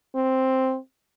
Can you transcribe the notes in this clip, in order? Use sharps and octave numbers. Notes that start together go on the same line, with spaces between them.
C4